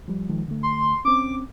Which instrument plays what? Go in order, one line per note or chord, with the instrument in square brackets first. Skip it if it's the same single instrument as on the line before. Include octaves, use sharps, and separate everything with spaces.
[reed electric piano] F3 G3
D#3 F3 G#3
D3 A3
[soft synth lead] C6
[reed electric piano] C4 C#4 [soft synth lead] D6